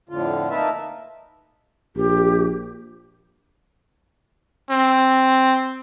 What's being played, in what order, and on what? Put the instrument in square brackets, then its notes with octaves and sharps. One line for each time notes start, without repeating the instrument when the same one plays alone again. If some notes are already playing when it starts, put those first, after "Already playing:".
[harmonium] F2 A2 D3 F4
A#3 D#4 A#4 B4 E5 A5
[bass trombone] A#1 [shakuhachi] G4
[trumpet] C4